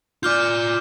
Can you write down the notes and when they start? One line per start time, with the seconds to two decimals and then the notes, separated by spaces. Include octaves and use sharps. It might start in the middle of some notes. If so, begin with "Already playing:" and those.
0.23 F4 D5 D6 F6 G6